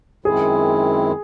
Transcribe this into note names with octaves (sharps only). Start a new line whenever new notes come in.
F#2 D#3 G#3 C4 E4 G#4